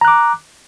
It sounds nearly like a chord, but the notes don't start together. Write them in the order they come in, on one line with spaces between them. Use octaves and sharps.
A#5 F#6 D6